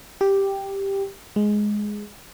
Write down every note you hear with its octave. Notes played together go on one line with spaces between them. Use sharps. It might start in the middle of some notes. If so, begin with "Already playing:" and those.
G4
G#3